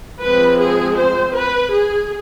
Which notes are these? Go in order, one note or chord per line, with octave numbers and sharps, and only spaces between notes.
F3 G#3 C4 B4
G#4
C5
B4
G#4